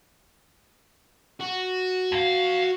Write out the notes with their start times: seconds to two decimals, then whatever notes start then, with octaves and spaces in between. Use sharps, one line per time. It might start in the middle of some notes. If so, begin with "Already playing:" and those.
1.40 F#4
2.12 F2 F5